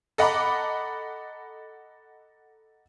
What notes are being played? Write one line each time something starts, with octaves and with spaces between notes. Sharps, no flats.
A4 D#5 F#5 A#5 B5 D6